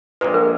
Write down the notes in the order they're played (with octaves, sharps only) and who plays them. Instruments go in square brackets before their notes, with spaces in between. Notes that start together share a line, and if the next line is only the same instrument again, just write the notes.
[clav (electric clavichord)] A#1 A#2 G#3 [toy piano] B4
[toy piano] A#4